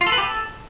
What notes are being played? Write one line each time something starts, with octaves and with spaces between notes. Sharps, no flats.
F4
A4
B4
G4
A4